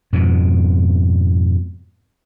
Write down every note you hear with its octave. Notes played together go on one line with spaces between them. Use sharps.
F2 G#2 B2